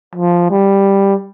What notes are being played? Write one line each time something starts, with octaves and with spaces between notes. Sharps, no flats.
F3
G3